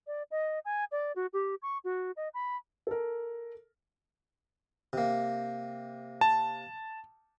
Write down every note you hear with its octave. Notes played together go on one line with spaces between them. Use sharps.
D5
D#5
G#5
D5
F#4
G4
C#6
F#4
D#5
B5
A4 A#4
C3 A#3
A5